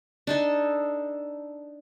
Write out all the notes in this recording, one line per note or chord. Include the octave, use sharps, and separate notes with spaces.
D4 D#4 A4